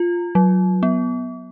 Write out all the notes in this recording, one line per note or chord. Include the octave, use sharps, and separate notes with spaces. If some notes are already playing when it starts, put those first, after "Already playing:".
Already playing: F4
F#3
B3